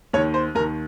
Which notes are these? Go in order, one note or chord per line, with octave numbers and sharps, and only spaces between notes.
D#2 D#3 C#5
C5
D#2 D#3 A#4